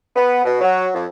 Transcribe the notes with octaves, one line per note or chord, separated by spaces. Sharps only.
B3
B2
F#3
F2